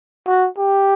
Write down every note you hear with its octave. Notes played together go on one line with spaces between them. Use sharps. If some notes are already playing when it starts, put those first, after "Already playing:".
F#4
G4